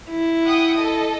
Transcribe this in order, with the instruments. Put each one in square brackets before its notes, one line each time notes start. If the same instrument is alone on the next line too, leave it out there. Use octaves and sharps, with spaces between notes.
[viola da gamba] E4
[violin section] F#5 G5 D#6
A4 D#5